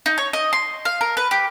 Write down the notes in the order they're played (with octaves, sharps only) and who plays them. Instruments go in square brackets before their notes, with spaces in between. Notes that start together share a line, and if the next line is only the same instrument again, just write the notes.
[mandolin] D#4
C#5
D#5
C6
F5
A#4
B4
G4